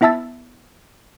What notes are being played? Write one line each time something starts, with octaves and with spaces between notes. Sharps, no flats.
B3 E4 E5 A5 E6 A6